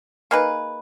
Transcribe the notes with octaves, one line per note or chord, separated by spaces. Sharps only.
A#3 D#4 G#4 B4